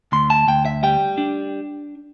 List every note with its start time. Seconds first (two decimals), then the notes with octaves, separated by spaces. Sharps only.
0.12 D2 C6
0.30 A5
0.48 D2 G5
0.65 E5
0.83 G3 G5
1.18 D4